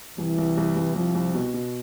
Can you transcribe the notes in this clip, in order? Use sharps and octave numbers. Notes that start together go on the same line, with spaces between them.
C2 E3
C2
C2
C2
C2 F3
C2
B2
B2